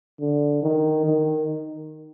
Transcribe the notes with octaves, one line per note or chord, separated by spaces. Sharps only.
D3
D#3
D#3